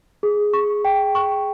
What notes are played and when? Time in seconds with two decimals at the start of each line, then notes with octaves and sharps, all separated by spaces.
0.23 G#4
0.53 C#6
0.85 G5
1.15 C#6